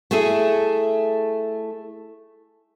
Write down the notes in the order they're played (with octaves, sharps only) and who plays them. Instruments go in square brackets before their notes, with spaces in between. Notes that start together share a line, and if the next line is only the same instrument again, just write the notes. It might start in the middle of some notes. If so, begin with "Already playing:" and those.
[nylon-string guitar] A3 E4 G#4 A4